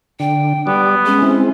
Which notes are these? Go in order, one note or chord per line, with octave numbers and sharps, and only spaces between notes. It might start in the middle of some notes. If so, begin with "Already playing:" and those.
D3 G5
G3 B3 D5
G#3 C#4
G#3 C4 E4